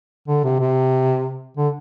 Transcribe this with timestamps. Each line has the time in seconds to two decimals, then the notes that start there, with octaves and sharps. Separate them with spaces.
0.28 D3
0.44 C3
0.60 C3
1.57 D3